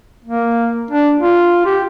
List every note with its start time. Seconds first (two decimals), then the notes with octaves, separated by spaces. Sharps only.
0.24 A#3
0.91 D4
1.18 F4
1.66 G4